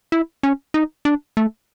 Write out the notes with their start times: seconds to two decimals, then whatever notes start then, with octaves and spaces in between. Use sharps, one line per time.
0.12 E4
0.43 C#4
0.74 D#4
1.05 D4
1.37 A3